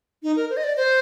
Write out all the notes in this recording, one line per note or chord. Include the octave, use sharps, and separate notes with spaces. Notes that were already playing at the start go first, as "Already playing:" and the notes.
D#4
A#4
C5
D#5
D5
C5